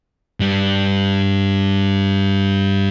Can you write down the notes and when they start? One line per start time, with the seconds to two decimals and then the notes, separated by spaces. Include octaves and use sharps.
0.40 G2 G3